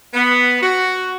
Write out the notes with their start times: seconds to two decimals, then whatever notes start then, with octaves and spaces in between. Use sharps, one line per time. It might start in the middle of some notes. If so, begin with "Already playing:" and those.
0.14 B3
0.61 F#4